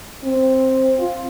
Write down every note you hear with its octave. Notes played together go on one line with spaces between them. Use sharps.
C4
F4